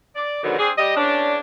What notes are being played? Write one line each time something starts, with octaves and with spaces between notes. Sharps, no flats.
D5
G#2 B2 D3 D#3 F#3
C4 D4 G#4
G3 D#5
E2 C#4 D4